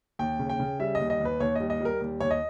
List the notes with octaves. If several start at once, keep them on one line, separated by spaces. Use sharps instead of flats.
D#2 G5
C#3
G5
C#3
G3 E5
D#2 D#5
D#5
D#2 B4
D#2 C#5
G3 D#5
D#5
G3 A#4
D#2
D#2 C#5
D#5